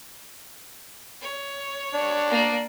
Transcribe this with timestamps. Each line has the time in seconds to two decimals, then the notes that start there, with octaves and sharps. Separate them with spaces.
1.22 C#5
1.94 D4
2.30 A#3 D5